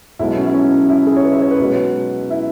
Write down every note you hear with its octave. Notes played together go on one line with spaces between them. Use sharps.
B1 B2 G#3 E4
C#4
E4
C#4
E4
G#4
C#5
B4
E5
C#5
B4
B1 B2 G#3
E4